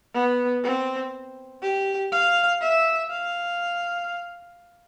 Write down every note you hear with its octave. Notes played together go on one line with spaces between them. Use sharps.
B3
C4
G4
F5
E5
F5